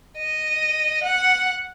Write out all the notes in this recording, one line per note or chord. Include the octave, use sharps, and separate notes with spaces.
D#5
F#5